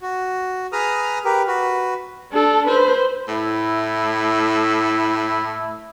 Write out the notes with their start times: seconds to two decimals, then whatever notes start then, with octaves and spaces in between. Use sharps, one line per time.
0.01 F#4
0.72 G#4 B4 A#5 D#6 F6
1.25 G4 A#4 B4
1.47 F#4 B4
2.32 D4 A4
2.68 B4 C5
3.28 A2 E4